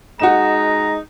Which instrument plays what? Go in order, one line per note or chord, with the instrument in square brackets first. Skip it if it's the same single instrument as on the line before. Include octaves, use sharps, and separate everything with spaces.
[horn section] G#3 D#4 A#5 [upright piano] F#4 E7